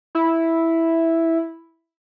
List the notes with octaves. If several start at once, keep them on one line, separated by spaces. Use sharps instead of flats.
E4